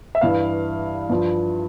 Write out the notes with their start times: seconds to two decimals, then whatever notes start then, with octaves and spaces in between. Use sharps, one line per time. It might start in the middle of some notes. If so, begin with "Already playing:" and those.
0.15 E5
0.21 G2 E3 F5
1.09 G2 F3